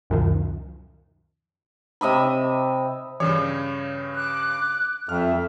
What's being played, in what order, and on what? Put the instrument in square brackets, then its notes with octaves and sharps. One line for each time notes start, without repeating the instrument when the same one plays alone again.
[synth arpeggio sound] C#2 F#2 B2 D#3 F3
[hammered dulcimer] C3 D#5 E5 B5
[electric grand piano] G2 C#3 C#5 [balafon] E3
[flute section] D6 F#6
[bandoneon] F2 [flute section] E5 [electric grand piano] F6